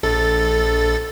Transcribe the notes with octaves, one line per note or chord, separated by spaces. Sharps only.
A#1 A4 A6